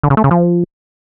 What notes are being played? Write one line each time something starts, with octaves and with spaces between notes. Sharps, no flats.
D3
C#3
A3
C#3
F3